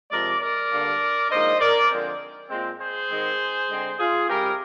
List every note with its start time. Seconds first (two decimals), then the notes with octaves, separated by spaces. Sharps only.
0.11 C3 F3 G#3 A#4 D5
0.41 A#4 D5
0.71 G2 D3 G3 A#3 D4
1.31 G#2 F3 A#3 D4 C5 D#5
1.60 A#4 D5
1.90 D3 F3 G#3 C4
2.50 A#2 G#3 C4
2.79 G#4 C5
3.10 G#2 D#3 G#3 C4
3.69 D3 G#3 C4
3.98 F4 G#4
4.28 C3 G3 C4 G4 A#4